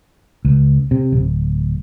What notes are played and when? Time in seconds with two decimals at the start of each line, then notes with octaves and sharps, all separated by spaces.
0.45 C#2
0.91 C3
1.12 D1